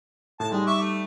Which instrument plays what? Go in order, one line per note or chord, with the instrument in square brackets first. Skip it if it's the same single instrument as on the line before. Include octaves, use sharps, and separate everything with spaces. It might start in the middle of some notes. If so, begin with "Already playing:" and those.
[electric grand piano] A2 [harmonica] A5
[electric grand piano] G3 D#4 [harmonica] G#3
[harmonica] E5 C#6 D6
A3